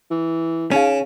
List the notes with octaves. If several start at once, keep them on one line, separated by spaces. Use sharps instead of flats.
E3
C#3 C#4 D#4 F5